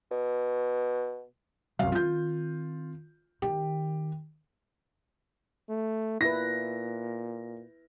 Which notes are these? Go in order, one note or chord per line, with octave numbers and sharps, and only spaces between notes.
B2
C2 F#2 F5
D#3 C4 F4 G6
D#3 G4
A3
A#2 E4 B4 A#6